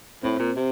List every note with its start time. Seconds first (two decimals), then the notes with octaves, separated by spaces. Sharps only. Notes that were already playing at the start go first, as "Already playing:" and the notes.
0.23 A2 C4
0.39 A#2
0.56 C3